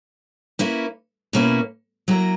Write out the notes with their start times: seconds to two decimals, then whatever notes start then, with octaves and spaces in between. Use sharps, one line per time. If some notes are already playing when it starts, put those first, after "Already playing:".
0.59 A#3 C#4 E4 B4
1.33 B2 A#3 C#4 E4 B4
2.08 F#3 A#3 E4 A#4